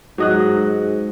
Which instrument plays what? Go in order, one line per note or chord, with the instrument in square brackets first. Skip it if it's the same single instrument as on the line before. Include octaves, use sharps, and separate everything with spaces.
[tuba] G#2 [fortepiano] F#3 D#5 F#6